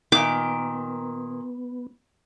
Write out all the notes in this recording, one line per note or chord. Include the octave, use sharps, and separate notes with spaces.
A#2 D#3 B3 D6